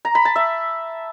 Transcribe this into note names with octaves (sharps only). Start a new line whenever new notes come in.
A#5
B5
A5
E5